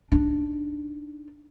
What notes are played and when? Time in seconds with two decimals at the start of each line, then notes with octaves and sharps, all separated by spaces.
0.12 D4 D#4